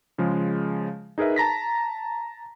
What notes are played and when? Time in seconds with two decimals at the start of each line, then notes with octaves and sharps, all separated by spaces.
0.18 C#3 F3 G#3
1.18 D#4 G#4 A#4 B4 E5
1.36 A5 A#5 A#6 B6